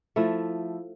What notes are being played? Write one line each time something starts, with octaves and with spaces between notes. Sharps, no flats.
F3 A3 E4